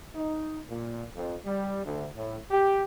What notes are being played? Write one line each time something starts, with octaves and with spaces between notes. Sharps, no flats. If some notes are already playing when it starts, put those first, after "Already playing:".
D#4
A#2
F2
G3
D2
A2
G4